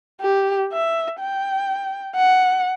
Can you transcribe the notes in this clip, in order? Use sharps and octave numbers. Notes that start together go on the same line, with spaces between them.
G4
E5
G5
F#5